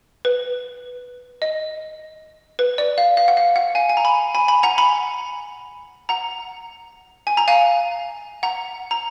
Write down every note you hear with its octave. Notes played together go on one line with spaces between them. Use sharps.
B4
D#5
B4
D5
F5
F5
F#5
F5
F#5
F5 G#5
G#5
A#5
G#5 B5
G#5 B5
G#5 B5
F#5 A#5
G#5 B5
F#5 A#5
G#5
A#5
F5 G#5
F#5 A#5
A#5